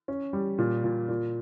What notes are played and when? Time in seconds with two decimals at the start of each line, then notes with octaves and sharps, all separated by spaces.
0.08 C#4
0.33 G3
0.58 A#2
0.84 A#2
1.09 A#2